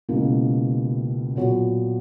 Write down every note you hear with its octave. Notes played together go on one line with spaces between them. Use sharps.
C#2 B2 A#3 E4
A#2 F#3 B3 F#4 C#5